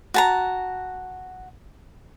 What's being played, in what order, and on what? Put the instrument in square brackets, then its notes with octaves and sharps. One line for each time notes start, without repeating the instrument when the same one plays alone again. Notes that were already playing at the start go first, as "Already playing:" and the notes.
[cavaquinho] F#4 A5 A#5